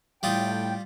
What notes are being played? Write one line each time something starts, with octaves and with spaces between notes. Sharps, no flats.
A2 G3 F4 G5 D#6